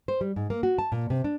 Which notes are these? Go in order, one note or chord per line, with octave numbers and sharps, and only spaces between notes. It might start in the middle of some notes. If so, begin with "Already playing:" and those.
C5
G3
G#2
A#3
F#4
A5
A#2
C3
D4